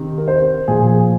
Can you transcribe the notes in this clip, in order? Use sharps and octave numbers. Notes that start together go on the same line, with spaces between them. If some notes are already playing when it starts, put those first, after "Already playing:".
Already playing: C3 D#3
A#4
C5
A#2 F3 G#4
G#4